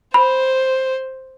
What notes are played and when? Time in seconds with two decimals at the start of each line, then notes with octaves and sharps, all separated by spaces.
0.14 C5 B5